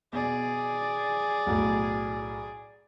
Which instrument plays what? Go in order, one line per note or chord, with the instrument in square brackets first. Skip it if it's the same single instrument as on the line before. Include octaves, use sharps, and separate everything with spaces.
[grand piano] B2 [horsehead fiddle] G#4 D5
[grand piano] B1 A2